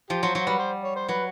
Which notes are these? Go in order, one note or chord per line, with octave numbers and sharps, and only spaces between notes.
F3 G4
F#3 C5
F#3 C5
G3 B4
C5
C#5
C5
F#3 B4